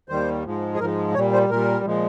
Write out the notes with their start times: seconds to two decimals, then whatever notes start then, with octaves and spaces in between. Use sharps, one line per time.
0.09 D#2 D#3 G3 C5
0.45 G#2 F3 G#3
0.74 G#4
0.79 G#2 F3 G#3 A#4
1.14 A#2 G3 C#5
1.33 C5
1.50 A#2 G3 A#4
1.85 A#2 F3 G#3